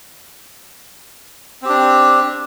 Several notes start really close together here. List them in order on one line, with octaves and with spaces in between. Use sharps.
C4 G4 D4